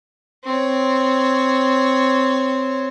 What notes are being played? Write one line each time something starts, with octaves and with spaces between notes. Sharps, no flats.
C4 C#5